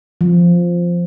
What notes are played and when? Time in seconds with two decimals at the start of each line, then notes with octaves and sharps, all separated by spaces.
0.21 F3